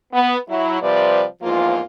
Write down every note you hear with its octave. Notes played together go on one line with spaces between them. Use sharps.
B3
F#3 E4
C3 F3 G3 B4 D5
E2 G#2 F3 A#3 F4